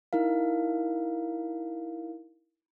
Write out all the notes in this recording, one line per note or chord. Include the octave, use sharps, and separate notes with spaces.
D#4 E4 A#4 F5